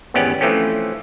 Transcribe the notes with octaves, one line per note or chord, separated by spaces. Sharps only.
G#1 E2 B3 C#4 G4 D5
E3 F3 A3 C4 C#4